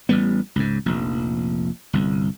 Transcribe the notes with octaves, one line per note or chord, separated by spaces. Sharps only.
A1 G3 B3
C#2 G#2
F1 A#1
G1 C2